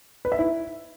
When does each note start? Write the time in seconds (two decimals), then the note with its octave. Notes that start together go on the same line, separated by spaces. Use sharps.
0.25 B4
0.32 E5
0.39 E4